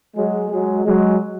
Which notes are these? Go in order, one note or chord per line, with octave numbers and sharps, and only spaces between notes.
F#3 G#3
F#3 G#3
F#3 G#3